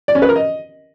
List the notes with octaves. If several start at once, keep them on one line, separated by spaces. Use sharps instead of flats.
D5
C#4
B4
A#4
D#5